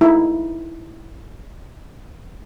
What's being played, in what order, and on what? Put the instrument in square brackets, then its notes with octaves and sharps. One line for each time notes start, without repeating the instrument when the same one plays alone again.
[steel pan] D#4 E4